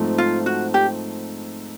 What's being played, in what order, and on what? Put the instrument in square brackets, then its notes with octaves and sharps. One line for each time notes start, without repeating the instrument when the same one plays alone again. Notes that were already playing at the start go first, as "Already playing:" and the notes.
Already playing: [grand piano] G#2 F3 A3 C4
[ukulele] F4
F#4
G4